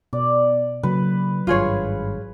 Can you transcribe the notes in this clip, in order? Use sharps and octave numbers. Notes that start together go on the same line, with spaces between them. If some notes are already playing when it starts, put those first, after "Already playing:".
B2 D5
C#3 F#3 A#3 B4
G#1 G2 F4 G#4 C#5